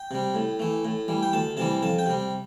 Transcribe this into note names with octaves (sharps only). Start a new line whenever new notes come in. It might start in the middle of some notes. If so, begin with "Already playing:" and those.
Already playing: G5
C3 G3
A2
E3 A3
A2
E3 G3
G5
D2 A5
C3 E3 G3 A5
F2 A5
G5
C3 G3